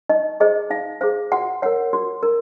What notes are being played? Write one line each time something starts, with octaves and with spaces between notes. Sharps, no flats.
D#4 D#5
G#4 C5 D#5
D#4 F5
G#4 C5 F5
F#4 F#5
A#4 C#5 F#5
F#4
A#4